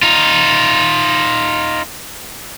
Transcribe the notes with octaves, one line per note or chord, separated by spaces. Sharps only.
D#4 F4